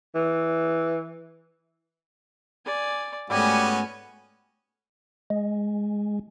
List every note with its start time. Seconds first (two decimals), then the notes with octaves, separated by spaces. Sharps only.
0.15 E3
2.66 D5 G#5
3.30 G#2 G3 A3 B3 C#4 F#4 G#5
5.30 G#3